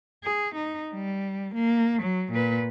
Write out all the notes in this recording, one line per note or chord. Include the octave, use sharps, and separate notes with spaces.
G#4
D#4
G3
A#3
F#3
A#2 B4